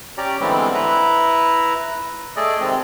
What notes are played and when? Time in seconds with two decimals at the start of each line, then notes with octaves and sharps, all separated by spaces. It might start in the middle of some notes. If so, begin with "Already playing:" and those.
0.17 C#4 G4 D5 A#5
0.40 D3 E3 G3 G#3 B3 C4
0.74 E4 B4 A#5
2.36 A3 G#4 A4 D5 D#5
2.60 C3 D#3 G#3 C4